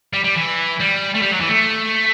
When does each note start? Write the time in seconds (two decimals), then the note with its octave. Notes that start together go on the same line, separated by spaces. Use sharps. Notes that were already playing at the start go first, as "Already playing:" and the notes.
0.13 G3
0.24 G3
0.35 E3
0.81 G3
1.15 A3
1.22 G3
1.31 F#3
1.40 E3
1.49 A3